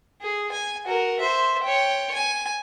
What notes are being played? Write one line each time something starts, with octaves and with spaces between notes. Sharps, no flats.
G#4
G#5
F#4 A#4
C5 E5
C#5 G5
G#5